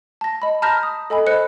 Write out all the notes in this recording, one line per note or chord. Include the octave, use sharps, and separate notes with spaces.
A5 A#6
D#5 B5
A5 A#5 F6 G6 A#6 B6
D#6
A4 D#5 G#5 B5
C5 D#5 F#6 C#7